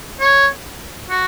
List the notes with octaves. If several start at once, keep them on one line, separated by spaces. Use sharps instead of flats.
C#5
F#4